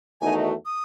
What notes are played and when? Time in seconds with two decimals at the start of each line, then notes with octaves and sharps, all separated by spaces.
0.21 E2 D#3 A3 D#4 F#4 G#5
0.66 D#6